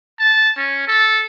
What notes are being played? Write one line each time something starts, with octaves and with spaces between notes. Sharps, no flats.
A5
C#4
A4